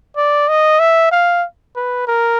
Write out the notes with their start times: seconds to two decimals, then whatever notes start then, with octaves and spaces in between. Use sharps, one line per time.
0.17 D5
0.48 D#5
0.80 E5
1.12 F5
1.76 B4
2.07 A#4